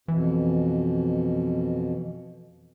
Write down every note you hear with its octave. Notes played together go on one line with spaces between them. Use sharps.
F2 B2 E3